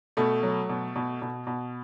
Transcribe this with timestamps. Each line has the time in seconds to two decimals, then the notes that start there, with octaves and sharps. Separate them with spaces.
0.17 B2 A3
0.43 F#3
0.69 B2
0.96 B2
1.22 B2
1.47 B2